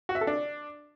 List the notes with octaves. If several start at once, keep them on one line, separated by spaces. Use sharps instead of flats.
F#4
E5
A4
D4